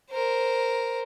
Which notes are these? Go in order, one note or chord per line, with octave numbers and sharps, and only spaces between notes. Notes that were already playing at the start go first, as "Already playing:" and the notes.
A#4 C5